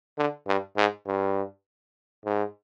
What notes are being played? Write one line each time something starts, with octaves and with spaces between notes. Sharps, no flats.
D3
G2
G#2
G2
G#2